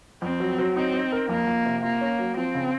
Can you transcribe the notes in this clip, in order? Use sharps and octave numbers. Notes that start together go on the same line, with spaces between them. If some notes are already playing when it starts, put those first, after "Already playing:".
F2 C4
F#3
F#3
C4 D#4
D#4
A#4
F2 A#3
F2
C3
A#3 F4
C#4
F#3
F3 C4
C#3